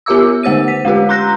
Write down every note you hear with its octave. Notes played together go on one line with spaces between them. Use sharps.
B3 G4 A#4 E5 D6 E6
D3 A3 C5 E6 D#7
B6
G#3 C#4 F4 G4
A#5 C6 F#6 G6 A#6